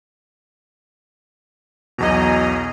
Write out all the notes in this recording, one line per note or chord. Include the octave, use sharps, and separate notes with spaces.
B1 E2 B2 D#5 G#5 A#5